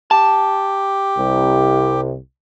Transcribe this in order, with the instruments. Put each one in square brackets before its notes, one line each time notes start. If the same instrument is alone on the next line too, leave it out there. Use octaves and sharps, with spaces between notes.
[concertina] G4 [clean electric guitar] A5
[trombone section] C2 C3